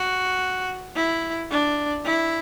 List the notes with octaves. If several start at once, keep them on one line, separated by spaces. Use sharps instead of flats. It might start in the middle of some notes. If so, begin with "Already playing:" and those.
Already playing: F#4
E4
D4
E4